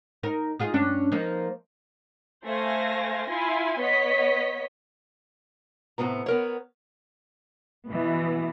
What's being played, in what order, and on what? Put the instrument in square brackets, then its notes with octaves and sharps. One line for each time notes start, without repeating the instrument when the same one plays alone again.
[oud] D#4 A#4
D#4 F4 G#4
G2 C#4 D4
F3 A#3 D#4
[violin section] A3 C5 F5 G#5 A#6
E4 F4 G#5 C6
B3 C#5 D#5 B6
[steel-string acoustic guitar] A2 C3 E3 B3 A#5
B3 A#4 C#5
[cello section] B2 E3 B3